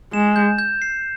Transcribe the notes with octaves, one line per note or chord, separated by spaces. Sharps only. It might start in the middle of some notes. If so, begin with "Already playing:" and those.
G#3 E7
G6
G6
C7